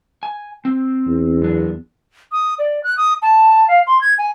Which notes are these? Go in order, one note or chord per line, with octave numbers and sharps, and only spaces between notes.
G#5
C4
E2
F#2 D4
D#6
D5
F#6
D#6
A5
F5
C6
G#6
G#5